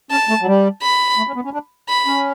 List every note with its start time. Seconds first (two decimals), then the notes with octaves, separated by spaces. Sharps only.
0.11 C#4 A5
0.29 A3
0.41 F#3
0.47 G3
0.82 B5
1.17 A3
1.27 C#4
1.36 B3
1.45 C#4
1.53 D4
1.89 B5
2.06 C#4